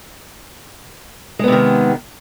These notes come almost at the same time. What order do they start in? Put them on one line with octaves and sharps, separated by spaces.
G#3 B3 C3 D#3